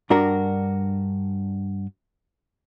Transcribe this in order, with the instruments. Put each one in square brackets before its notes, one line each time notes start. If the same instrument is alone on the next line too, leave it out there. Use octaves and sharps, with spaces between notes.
[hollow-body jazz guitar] G2 D4 F#4 A#4